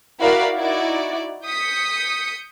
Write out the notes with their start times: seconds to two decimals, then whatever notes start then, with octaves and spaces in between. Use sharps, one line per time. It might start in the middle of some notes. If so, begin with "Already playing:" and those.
0.20 E4 F#4 A#4 D5 F5 B5
0.55 D#4 E4 F#4 D5
1.45 D#6 G6 B6 C#7